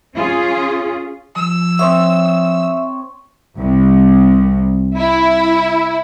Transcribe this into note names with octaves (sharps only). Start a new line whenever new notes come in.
C#4 F4 G#4
F3 E6
C4 C#5 E5 D#6
C2
E4